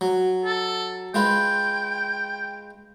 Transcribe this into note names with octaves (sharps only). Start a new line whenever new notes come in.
F#3
A4
G#3 F4 B4 G5